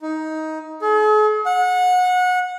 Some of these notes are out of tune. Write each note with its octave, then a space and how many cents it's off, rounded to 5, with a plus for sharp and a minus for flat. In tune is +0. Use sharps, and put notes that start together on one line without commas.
D#4 +15
G#4 +45
F#5 -25